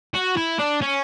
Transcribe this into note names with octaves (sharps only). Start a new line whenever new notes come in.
F#4
E4
D4
C#4